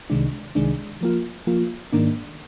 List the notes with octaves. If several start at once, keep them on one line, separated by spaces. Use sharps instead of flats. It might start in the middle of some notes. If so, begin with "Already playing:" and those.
C2 C3 D#3 G#3 D4
C2 C3 D#3 G#3 D4
F3 A#3 F4
F3 A#3 F4
G#2 D#3 A#3 D4